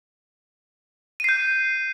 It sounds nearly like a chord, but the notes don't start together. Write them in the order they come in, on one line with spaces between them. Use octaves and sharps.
D#7 C7 G6